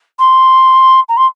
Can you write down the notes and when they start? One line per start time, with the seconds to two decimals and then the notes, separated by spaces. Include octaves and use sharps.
0.19 C6
1.09 A#5
1.17 C6